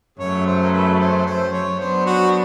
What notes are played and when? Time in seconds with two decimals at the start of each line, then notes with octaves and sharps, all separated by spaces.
0.20 F#2 C#3 F#3 A3 C#5
0.47 C5
0.63 A#4
0.73 B4
1.00 C5
1.26 C5
1.52 C#5
1.79 F#3 B3 D4 C5
2.06 F#4